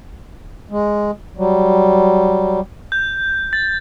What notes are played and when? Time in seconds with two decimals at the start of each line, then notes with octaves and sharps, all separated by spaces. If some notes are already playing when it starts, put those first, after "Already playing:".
0.71 G#3
1.37 F#3 G3
2.92 G6
3.53 A6